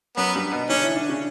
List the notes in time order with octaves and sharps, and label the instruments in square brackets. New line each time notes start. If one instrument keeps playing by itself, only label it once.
[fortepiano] F#2 F#3 [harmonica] B3
[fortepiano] G2 G3
B2 B3
[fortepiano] D3 D4 [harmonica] C#4
[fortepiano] E3 E4
D3 D4
C#3 C#4